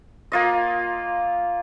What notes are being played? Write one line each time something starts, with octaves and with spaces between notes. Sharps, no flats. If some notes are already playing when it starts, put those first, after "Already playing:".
A#3 F4 D#5